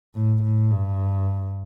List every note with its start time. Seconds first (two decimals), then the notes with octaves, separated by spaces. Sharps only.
0.15 A2
0.43 A2
0.71 G2